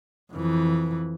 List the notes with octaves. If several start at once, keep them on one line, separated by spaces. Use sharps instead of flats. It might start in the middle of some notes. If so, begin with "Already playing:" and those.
F2 E3